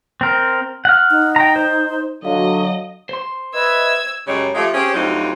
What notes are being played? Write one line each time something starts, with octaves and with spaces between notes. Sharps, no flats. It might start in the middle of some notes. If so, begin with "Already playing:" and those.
C4 A#4
F#5 F6
D#4
G5 A#5
C5
D3 F#3 F#4 D#5 F5
C5 C6
B4 D#5 E5 E6 G#6
F#2 C#3 G3 G#3 C#5
F3 G#3 A3 F4 G4
C4 C#4 G4 G#4 C5
D2 F#3 G3 C4 D#4 F4